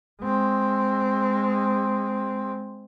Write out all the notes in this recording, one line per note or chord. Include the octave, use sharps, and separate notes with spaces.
G#3 C4